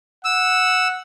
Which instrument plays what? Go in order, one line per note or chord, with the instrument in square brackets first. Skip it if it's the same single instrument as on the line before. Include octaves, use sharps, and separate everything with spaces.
[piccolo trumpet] F#5 [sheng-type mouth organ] E6